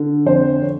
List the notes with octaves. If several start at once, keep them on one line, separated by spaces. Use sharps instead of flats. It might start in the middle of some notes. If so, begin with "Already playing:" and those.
Already playing: D3
F2 C5
C#5